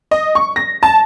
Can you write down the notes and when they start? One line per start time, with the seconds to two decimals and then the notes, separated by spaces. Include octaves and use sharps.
0.11 D#5
0.35 C#6
0.56 A#6
0.83 A5